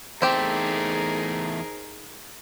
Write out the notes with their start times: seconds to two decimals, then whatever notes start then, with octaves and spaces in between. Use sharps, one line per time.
0.22 E2 A3 C4 D#4 G4 G#4 A#4